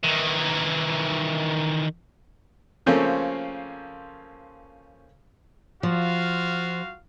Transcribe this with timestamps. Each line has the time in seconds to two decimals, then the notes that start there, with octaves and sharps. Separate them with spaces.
0.03 D#3 E3
2.86 C#3 F3 A3 A#3 C4 C#4
5.83 F3 F4 F#4 F5